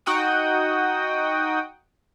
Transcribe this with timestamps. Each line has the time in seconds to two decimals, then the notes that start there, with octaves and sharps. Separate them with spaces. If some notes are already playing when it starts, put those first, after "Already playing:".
0.06 D#4 F#4 F#5 G5 D#6